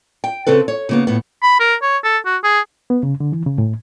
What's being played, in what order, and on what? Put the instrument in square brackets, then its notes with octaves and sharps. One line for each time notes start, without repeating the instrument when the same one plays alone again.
[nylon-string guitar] G5
C#3 C4 A4 B4
C#5
C#3 A#3 B3
A2 B3
[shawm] B5
A#4
C#5
A4
F#4
G#4
[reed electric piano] B3
C#3
D3
E3
C#3
A2